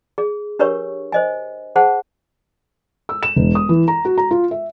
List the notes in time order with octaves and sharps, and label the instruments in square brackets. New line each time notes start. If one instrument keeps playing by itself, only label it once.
[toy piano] G#4
D4 G4 A#4 B4 C#5 C#6
C5 D#5 G#5
G#4 C5 F#5 A5
[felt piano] E6
E7
E1
D#6
E3
A#5
F#4
A#5
F4
E5